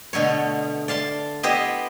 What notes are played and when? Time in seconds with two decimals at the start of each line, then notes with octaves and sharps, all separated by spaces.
0.13 B2 D3 A3 C#5
0.88 D5 F5 A5 C6
1.43 B3 E4 G4 C5 D#5 G5